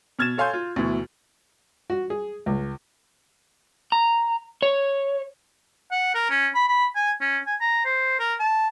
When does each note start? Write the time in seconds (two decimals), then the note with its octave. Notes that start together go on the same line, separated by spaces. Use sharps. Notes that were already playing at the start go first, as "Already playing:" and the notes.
0.19 B2 F6 G#6 A6 E7
0.38 A4 C#5 F5 G#5 C6 G6
0.54 F4
0.76 D2 B2 E3
1.90 F#4
2.10 G#4
2.46 C#2
3.92 A#5
4.62 C#5
5.91 F#5
6.15 A#4
6.30 C#4
6.55 B5
6.68 B5
6.95 G#5
7.21 C#4
7.46 G#5
7.60 A#5
7.85 C5
8.19 A#4
8.39 A5